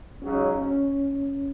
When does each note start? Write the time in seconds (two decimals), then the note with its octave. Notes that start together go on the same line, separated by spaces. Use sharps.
0.22 C#2 C#3 F#3 C#4 D#4
0.62 C#4